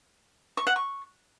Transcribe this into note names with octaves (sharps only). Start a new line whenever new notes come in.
C#6
F#5
C#6